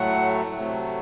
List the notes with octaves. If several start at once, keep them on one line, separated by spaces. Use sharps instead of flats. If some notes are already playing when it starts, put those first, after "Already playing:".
Already playing: A2 F#3 A3 F#5
C3 F#3 A3